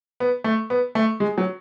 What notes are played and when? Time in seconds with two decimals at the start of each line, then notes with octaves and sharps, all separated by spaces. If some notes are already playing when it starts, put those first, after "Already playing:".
0.20 B3
0.44 A3
0.70 B3
0.95 A3
1.20 G#3
1.38 F#3